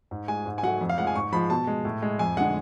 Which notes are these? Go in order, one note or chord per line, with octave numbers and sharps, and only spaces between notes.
G#2
G#3 G#5
G#2
G#5
F#3 A3 F#5
F2
F5
F3 G#3 F#5
G#5
G#2 C#6
F3 G#3 B5
B2 A5
G#3
A2
G#3
F2 G#5
D3 G#3 F#5